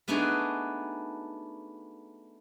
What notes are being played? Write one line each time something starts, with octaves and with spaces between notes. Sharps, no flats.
A3 B3 D4 D#4 F#4 G#4